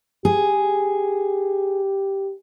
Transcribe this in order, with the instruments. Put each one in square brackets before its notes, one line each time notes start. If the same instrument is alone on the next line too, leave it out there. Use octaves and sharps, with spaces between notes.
[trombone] G4 [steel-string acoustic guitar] G#4